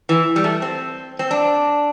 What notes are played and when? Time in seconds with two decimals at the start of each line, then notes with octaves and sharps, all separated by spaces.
0.09 E3
0.36 G3
0.44 A3
0.62 C4
1.19 C4
1.31 D4